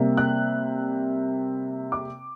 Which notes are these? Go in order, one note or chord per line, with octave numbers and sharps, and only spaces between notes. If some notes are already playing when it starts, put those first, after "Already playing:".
Already playing: C3 G3 A#3
F#6
D6